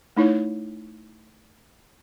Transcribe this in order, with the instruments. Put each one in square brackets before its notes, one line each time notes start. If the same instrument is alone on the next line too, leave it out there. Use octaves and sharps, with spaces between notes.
[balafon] A3 D#4 E4 C#5